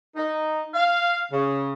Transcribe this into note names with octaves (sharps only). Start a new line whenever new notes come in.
D#4
F5
C#3